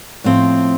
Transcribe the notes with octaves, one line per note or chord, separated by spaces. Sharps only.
A2 F3 C4